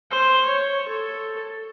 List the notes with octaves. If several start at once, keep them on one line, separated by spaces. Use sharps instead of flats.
C5
C#5
A4